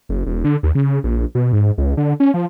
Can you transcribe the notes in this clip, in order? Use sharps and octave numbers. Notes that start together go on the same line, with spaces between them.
F#1
E1
D3
D#2
C#3
A#1
B2
G#2
C#2
D3
C#4
F3